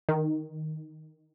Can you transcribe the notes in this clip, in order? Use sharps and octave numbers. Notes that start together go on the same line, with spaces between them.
D#3